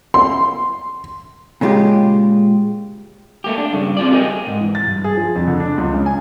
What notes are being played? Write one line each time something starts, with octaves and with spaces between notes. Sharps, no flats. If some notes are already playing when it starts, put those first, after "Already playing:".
C6
A#2 C#3 G#3 F4 G4
A3 A#3 G4
D4
G2 C#3
C4 F4 D5
A3 G4 G#4 A#4 D#5 G5
G#2
E3
A6
G2
G#4
F3
F2
D3
D4
C#2
C#3
G#5